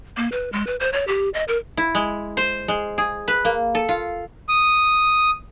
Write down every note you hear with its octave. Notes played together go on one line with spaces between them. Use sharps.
A#3
B4
G#3
B4
C5
C#5
G4
D#5
A#4
E4
G#3
C5
G#3
G#4
B4
A#3
A4
F4
D#6